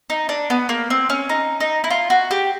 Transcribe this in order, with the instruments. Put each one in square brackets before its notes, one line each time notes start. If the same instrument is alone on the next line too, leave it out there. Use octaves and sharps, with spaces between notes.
[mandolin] D#4
D4
B3
A#3
C4
C#4
D#4
D#4
E4
F4
F#4
G4